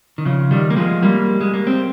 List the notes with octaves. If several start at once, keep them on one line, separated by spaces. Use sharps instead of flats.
D#3
C#3 F3
D#3 G3
A#3
F3 G#3
G3 A#3
G#3
A#3
C4